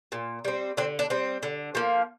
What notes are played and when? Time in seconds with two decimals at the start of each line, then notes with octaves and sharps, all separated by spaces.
0.12 A#2
0.45 G3 C4
0.77 D3 C4
0.99 D4
1.10 G3 C4
1.43 D3
1.75 F3 A#3